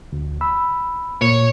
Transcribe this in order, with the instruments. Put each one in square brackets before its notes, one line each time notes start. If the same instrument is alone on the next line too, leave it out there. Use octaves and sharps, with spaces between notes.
[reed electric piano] D2
B5 E6
[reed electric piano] A#2 [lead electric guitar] C#5